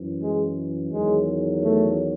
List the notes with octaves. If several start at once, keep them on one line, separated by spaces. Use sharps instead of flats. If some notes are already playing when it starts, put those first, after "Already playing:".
Already playing: F#2 E3
G#3
E2 D#3 F#3 G#3
A3